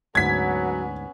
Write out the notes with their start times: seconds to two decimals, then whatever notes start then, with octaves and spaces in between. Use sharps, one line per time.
0.15 D2 G#2 F#3 B3 C#4 G#6 B6